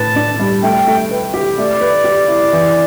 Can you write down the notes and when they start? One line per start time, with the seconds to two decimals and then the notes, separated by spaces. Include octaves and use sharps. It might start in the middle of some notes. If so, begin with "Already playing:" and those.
Already playing: A2 B4 A5
0.16 D4
0.40 G3
0.63 A3 G5
0.87 A3
1.11 B4
1.34 G4
1.58 A3 D5
1.81 B4
2.04 G4
2.28 E4
2.53 E3